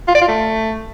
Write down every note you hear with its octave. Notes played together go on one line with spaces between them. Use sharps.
F4
D5
F4
A3